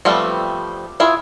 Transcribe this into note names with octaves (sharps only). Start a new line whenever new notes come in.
F3 G3 A3 B3 C4
E4 F4 G#4 E5